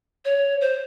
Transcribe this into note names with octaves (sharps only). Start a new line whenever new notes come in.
C#5
C5